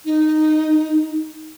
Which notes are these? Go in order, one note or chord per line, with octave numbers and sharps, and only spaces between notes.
D#4